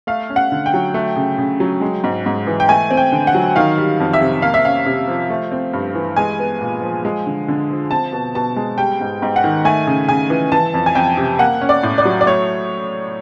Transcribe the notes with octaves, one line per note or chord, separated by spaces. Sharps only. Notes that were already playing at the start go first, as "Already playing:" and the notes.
A3 F5
C#4
F#5
D3
G5
F#3
A3
C#3
C#3
F#3
G#3
G#2
G#2
E3
G5
A3 G#5
C4
G5
D3
F#5
F#3
D#3 F5
G3
F2
E5
C3
A#3 F5
E5
C#4 F5
C3
F3
A3
C4
G2
E3
G#3 G#5
B3
A#2
F3
G#3
D3
D3
F3
C4 A5
B2
B2 A5
G#3
G3 G5
G#2
G#2
F#5
D#3
A3 G#5
C#3
C#3 G#5
E3
E3 A5
F2
G#5
F2 G5
C3
A#3 F#5
C#4
D5
A2
D5
F#3
D5
A3 C#5